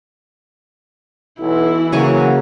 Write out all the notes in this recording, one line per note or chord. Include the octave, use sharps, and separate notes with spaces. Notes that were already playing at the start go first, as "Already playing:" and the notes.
B1 E3 E4
C#3 F#3 A#3 G#5 C#6